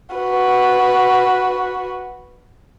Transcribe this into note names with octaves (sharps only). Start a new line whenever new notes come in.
F#4 B4